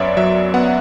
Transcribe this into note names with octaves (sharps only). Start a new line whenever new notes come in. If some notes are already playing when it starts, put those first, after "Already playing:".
Already playing: F#2 B3 C#5 D5 E5
F#3 E5
B3 F#5